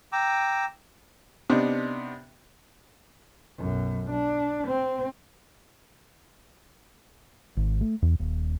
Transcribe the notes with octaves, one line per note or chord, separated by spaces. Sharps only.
G5 A#5 D6 E6
C3 B3 D4 D#4
B1 F#2
D4
C4
G#1
A3
E2
D#1